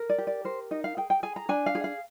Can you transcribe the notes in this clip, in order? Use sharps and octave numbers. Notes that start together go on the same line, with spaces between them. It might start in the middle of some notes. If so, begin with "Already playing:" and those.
Already playing: A#4
D5
G4
D5
A#4 C5
D#4 D#5
F5
G#4 G5
G5
G#4 G#5
A#5
D4 G#5
F5
G#4
F5